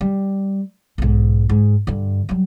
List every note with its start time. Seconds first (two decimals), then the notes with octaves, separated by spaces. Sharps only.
0.01 G3
0.98 B1 G#2
1.50 G#2
1.87 G2 D3
2.29 F#3 G3